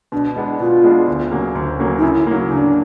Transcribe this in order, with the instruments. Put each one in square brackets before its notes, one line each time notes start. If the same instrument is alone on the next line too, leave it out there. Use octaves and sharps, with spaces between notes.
[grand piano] B2 [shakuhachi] D4
[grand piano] G#3 B3 D4
[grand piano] B2 [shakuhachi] F4
[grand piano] G#3 B3 D4
D2
C#3 F#3 A#3
D2
C#3 F#3 A#3
[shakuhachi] D#4
[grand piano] C#3 [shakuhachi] E4
[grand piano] F#3 A#3
[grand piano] C#3 [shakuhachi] D4